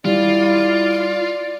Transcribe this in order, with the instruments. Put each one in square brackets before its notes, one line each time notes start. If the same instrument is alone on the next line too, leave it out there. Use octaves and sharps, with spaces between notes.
[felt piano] G3 [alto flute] E4 [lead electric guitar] F4 [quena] D5